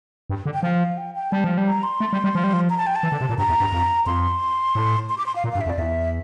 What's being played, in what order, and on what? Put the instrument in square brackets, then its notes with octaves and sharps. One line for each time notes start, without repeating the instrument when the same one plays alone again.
[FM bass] G2
D3
[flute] G5
[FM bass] F3 [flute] F5
[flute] G5
G5
[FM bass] G3 [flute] A5
[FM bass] F3
G3
[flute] A#5
C6
[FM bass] A3
G3
G3
F3
G3
F3
[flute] A#5
A5
G5
A5
[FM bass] E3
D3
C3
A#2
[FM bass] G2 [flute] A#5
[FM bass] E2
G2
F2
[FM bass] F2 [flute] C6
[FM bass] A2
[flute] C6
D6
C6
F5
[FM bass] A#2
[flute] F5
[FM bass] G2
[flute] E5
[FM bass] F2
[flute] D5
[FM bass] E2 [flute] E5